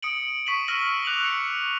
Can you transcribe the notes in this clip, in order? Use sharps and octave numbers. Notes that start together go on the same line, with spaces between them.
D#6 C#7 D7 F#7
C#6 B6 D#7 F#7
E6 F6 A#6 D#7 F#7
D6 F#6 F7 F#7
C#7